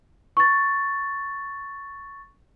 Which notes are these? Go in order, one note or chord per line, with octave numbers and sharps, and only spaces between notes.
C#6 A6